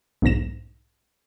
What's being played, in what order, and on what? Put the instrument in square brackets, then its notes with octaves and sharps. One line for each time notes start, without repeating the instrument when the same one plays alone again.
[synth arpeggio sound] B1 E2 G#2 A#6 E7